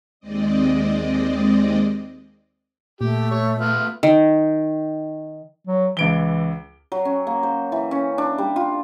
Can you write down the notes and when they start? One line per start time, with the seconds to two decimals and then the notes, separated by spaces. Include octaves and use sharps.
0.20 D#2 G#3 C4 D5 D#5
3.01 A#2 A3 G4
3.31 C#5
3.57 B3 F4
4.03 D#3
5.67 F#3
5.97 C#2 E3 D7 G7
6.92 F#3
7.05 C#4
7.27 A#3
7.43 C5
7.72 E3
7.91 C#4
8.18 D4
8.38 G3
8.56 F4